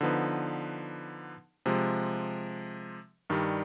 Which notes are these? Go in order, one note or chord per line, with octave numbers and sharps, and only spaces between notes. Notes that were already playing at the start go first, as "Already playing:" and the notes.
D3 F3 B3 D#4 B4
C3 F3 G#3
G2 D#3 G3